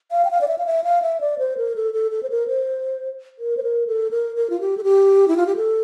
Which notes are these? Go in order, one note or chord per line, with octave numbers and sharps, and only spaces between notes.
F5
G5
F5
D5
E5
F5
E5
F5
E5
D5
C5
A#4
A4
A4
A4
C5
A#4
C5
A#4
C5
A#4
A4
A#4
A#4
F4
G4
A4
G4
E4
F4
G4
A4